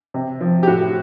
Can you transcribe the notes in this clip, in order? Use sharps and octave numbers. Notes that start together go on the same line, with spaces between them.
C3
F3
G4
A2 F#4